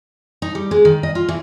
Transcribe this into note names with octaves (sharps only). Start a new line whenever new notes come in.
D#4
G3
G#3
D#3
D#5
F4
E3